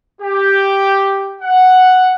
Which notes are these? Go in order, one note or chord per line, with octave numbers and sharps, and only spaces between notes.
G4
F#5